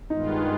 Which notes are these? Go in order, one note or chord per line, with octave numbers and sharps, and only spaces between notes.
G2 D#3 G#3 B3 D#4 F4